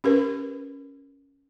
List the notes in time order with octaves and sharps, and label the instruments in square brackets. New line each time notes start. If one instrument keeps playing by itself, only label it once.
[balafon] C#4 G4 A#4 B4